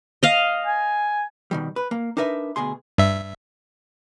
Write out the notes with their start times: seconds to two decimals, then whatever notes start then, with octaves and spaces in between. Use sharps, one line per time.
0.23 D#5 F5
0.66 G#5
1.51 B2 D#3 G3
1.76 B4
1.91 A#3
2.17 D4 D#4 A#4 B4 E5
2.56 D2 B2 G#4 C6
2.98 G2 E5